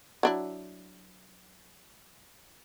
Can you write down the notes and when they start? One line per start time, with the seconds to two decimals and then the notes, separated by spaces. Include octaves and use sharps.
0.23 F#3 D4 E4